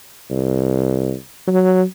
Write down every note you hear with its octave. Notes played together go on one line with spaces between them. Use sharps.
C2
F#3